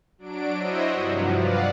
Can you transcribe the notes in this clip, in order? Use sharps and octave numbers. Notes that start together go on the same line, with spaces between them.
F#3 D4 D7
E4 F#4 C5 C#5 D#5 E5
G2 C3 F3 F#3
B4 D5 F5 F#5